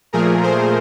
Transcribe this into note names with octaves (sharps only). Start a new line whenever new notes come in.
A#2 F3 A3 G#4 A#4
A#4 C5